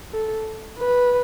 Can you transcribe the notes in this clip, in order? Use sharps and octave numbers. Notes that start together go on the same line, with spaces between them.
A4
B4